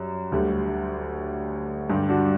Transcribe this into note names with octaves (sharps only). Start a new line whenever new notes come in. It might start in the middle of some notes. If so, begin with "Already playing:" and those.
Already playing: F#2 G3
D2 D3 G3
G2 D3 G3
D4 F#4